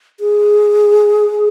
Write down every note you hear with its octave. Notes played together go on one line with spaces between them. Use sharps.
G#4